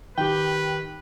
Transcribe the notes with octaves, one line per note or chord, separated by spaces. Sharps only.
D#3 G4 B4 G5